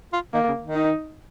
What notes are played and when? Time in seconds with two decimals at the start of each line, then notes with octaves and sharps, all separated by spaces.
0.13 F4
0.34 D#3 A#3
0.48 C#3
0.61 D#3
0.75 D#4